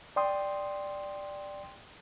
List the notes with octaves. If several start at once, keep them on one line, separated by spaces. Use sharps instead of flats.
D5 G5 C6 D#6